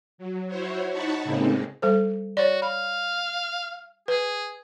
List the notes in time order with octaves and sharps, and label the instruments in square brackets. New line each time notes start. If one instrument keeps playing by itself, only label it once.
[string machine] F#3
E4 F#4 C5 C#5
D#4 F#5 A5 B5 C#6
A2 C#3 G#3 A#3 C4 D#4
[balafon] G3 A4 C5
[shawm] F#4 [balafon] C#5 D5
[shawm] F5 [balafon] B5
[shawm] G#4 [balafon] B4